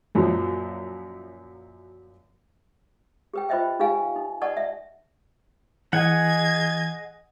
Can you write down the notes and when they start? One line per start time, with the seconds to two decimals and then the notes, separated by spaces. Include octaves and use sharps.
0.15 F#2 A#2 F3 F#3
3.34 G4 B4 G5
3.49 F4 B4 C5 D#5 E5 G5
3.79 D#4 G4 B4 F5 G#5
4.16 D#4
4.41 B4 D5 D#5 F#5 A5 C#6
4.57 E5
5.93 E3 G#4 D#5 F#5 G#5 G#6